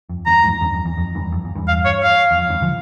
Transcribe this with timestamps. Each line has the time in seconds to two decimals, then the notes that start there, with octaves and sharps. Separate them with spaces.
0.09 F2
0.26 E2 G2 A#5
0.44 F2 G#2
0.61 E2 G2
0.74 F2
0.85 E2
0.98 F2
1.15 E2 G2
1.32 F2
1.45 E2
1.56 E2 G2
1.68 F5
1.85 C#5
2.03 F5
2.31 E2
2.38 F2
2.50 E2 G2
2.62 C#3 F3